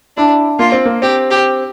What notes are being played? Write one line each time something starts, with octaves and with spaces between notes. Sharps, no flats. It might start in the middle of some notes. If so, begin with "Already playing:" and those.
D4 E4
A#3 F4
C4
A#3
C4 G4
G4